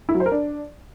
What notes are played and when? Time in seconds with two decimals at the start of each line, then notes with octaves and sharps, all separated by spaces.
0.09 E4
0.14 F#3
0.20 C5
0.26 A#4
0.32 D4